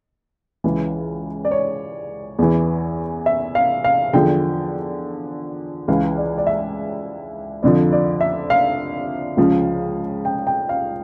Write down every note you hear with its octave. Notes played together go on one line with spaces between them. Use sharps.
C#2 C#3 E3
D5
C#5
E2 E3
E5
F5
F5
E2 D3 F3 G5
C#2 C#3 E3 F5
D5
D5
E5
F2 D3 F3 D5
D5
E5
F5
C#2 C#3 F3
G5
G5
F5